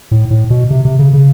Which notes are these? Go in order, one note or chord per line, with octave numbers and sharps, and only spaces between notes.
A2
A2
B2
C3
C3
C#3
C#3